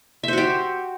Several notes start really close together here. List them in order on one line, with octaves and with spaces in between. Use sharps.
E5 C5 F#4 G4